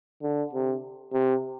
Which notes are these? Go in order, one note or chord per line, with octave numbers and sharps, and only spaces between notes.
D3
C3
C3